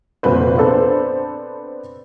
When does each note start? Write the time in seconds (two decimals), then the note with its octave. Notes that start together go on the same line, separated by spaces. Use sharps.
0.23 F1 D2 A#2 B4 C5
0.57 B3 C4 D4 A4 B4 C5